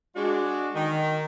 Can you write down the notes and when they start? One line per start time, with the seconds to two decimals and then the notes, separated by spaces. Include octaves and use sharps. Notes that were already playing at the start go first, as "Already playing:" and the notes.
0.15 G#3 D4 F#4
0.75 D#3